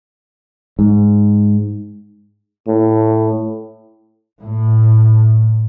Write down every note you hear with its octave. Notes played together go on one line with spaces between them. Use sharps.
G#2
A2
A2